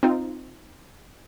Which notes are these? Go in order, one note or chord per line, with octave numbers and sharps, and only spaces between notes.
C4 D#4 F4